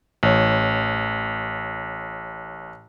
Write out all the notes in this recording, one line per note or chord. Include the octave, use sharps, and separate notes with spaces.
A1 C#5